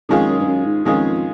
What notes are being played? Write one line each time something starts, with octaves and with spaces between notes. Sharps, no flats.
F2 D#3 G#3 C#4 F4 G#4
F#2
G2
F#2
G#2
F2 D#3 G#3 C#4 F4 G#4